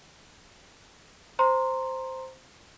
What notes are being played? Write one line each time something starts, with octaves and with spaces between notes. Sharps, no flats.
C5 A#5 C6